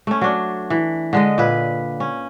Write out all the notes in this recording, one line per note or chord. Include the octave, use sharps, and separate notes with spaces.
A3 C#4
F#3 D4
E3
D3 G#3 D#5
A#2 B4
C#4